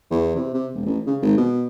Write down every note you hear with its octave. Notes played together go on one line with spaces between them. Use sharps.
E2
C3
C3
E1
A1
C#3
G#1
B2